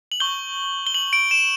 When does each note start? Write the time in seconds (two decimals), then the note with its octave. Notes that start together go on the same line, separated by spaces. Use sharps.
0.12 F#7
0.20 C#6 G6 G7
0.87 G7
0.94 F#7
1.13 D7
1.31 E7